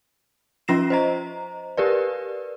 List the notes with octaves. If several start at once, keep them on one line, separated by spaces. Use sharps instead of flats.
F3 C#4 F4 A#6 C7 E7
C5 D#5 A#5
G4 A#4 B4 D5